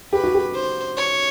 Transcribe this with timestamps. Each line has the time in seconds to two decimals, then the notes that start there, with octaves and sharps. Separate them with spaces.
0.12 G4 B4
0.24 F#4
0.34 G4
0.54 C5
0.97 C#5